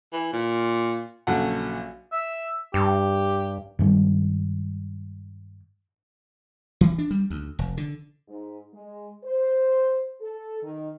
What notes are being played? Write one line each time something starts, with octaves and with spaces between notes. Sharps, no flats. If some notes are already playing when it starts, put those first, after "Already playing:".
E3
A#2
A#1 C#3 F#3 A4 F#5
E5
G2 G4
G2 D#3 G3 G#3
E3
D4
G3
D2
F1
D3
G#2
G#3
C5
A4
D#3